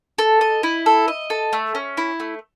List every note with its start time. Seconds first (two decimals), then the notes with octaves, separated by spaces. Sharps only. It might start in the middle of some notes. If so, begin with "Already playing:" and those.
0.18 A4
0.41 D#5
0.63 E4
0.86 A4
1.08 D#5
1.30 A4
1.53 A3
1.75 C#4
1.97 E4
2.20 A3